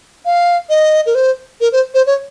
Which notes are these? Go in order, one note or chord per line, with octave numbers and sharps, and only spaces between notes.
F5
D#5
A#4
C5
A#4
C5
C5
C#5